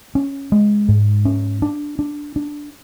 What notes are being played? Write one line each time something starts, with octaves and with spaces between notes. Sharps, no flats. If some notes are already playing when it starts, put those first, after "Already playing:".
C#4
G#3
G#2
C#4
D4
D4
D4